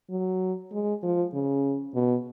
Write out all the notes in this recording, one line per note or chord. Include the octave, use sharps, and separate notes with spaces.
F#3
G#3
F3
C#3
B2